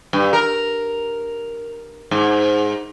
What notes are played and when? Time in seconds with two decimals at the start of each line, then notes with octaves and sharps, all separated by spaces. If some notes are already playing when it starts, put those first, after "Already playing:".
0.13 G2
0.33 A#4
2.11 G#2